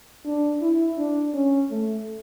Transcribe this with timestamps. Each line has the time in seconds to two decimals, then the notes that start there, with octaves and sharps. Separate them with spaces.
0.25 D4
0.61 E4
0.97 D4
1.34 C#4
1.70 A3